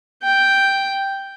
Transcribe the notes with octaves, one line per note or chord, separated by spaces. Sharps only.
G5